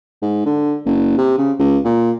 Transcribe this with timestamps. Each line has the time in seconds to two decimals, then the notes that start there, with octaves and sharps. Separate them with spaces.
0.22 G#2
0.46 D3
0.86 F#1
1.18 C3
1.38 C#3
1.59 C#2
1.85 A#2